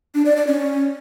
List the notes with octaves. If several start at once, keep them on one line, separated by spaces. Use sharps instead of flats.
D4
D5
D5
C#4